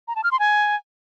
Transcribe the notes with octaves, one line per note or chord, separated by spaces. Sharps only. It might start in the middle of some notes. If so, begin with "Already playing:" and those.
A#5
A5
F6
C6
G#5